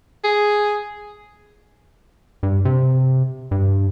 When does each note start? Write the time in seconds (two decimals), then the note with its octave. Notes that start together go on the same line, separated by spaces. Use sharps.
0.24 G#4
2.43 G2
2.65 C3
3.51 G2